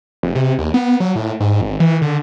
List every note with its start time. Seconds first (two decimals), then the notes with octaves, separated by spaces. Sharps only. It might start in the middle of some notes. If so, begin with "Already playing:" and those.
0.23 F1
0.35 C3
0.58 D#2
0.74 B3
1.00 F#3
1.16 A2
1.40 G#2
1.61 G#1
1.80 E3
2.02 D3